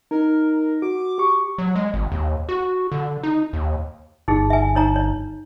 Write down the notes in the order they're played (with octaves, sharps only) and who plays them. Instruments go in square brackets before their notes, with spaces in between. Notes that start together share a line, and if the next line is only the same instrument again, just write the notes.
[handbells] D#4 [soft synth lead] A#4
[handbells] F#4 [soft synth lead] D6
[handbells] G4 C#6
[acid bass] F#3
G#3
G#1
D#2
F#4
D3
D#4
D#2
[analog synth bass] G1 [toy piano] D#4 G#4
[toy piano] E5 G#5
D#4 C#5 A#5
C#5